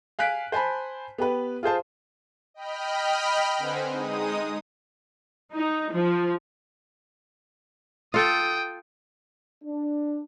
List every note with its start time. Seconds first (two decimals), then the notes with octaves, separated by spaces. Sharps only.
0.19 F5 G#5 F#6 B6 D7
0.52 C5 G#5 A5 B5
1.18 B3 G4 B4
1.63 F4 G#4 C5 A5
2.54 D#5 G5 B5 F6
3.58 D3 C4 B4 C5 F#5 G#5
3.90 G#3 D#4 D#6
5.55 D#4
5.93 F3
8.14 F4 A4 G5 D#6
9.64 D4